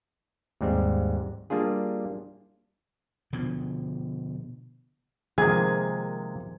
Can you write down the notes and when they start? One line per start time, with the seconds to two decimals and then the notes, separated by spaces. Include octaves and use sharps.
0.61 D#2 G#2 G3 C4
1.50 G3 A#3 D4 F4 G#4
3.33 B2 D3 F3
5.38 C3 D#3 F3 G#3 A#3 G#4 G#6